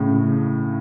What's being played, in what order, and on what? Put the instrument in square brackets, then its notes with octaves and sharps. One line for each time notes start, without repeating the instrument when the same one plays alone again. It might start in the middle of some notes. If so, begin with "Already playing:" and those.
Already playing: [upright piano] A2 C#3